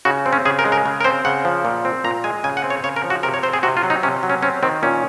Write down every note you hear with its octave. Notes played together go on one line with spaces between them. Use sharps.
C#3 F#4
C4
C#4
C#3 G#4
A#4
G#3
A#4
C#3
A#4
C4 C5
C#3 F#5
F3
A#2
C4
A#2 A#5
G#3 G#5
C#3 G#5
F#5
C4
C#5
C#3 C#5
A#4
F3
F#4
C3 A#4
C#5
C4 C5
G#4
C3 F#4
F4
F#3
D#4
C3 C#4
F#3
C#4
C4 C#4
D#3 C4
A#2 C#4